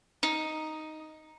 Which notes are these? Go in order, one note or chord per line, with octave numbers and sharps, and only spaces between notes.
D#4